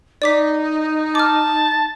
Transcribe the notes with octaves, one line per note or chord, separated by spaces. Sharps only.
D#4 D5 D6 B6
A5 D6 F6